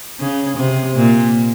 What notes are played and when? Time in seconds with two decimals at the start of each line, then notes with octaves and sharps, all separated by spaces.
0.20 C#3
0.57 C3
0.95 A#2